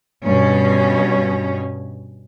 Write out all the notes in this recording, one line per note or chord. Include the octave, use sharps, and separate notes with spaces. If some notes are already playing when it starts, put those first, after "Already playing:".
G2 B2 C#4